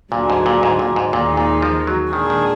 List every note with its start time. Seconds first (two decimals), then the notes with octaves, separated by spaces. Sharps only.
0.12 D2 A#2 D3 F#3 D4 G#4
0.30 G#2
0.46 A#2
0.63 G#2
0.79 A#2
0.96 G#2
1.13 D#2 A#2 D#3 G#3 D#4
1.37 A#2
1.62 F3
1.87 F#3
2.13 A#2 D#3 G#3 D4 G#4
2.30 D#3